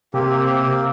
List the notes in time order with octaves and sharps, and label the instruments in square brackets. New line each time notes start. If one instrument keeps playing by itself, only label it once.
[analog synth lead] C3 [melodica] A#3 C4 G4